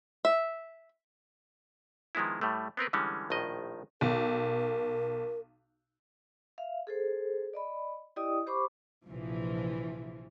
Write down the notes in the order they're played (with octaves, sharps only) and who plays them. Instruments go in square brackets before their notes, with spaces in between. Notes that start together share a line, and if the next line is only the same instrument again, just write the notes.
[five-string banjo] E5
[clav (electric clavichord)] D#3 F3 G#3 B3 E4
A2 G3 A3
B3 C4 A#4 B4
D3 E3 G3 G#3 C#4
A#1 A2 D#3 D#5
[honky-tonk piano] B1 [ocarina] A#4
[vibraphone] E5 F5
G#4 A4 C5
D5 D#5 B5
E4 G4 D5 D#5 G5 D#6
G4 C5 B5 C#6 D6
[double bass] A#1 C3 [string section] E3 F3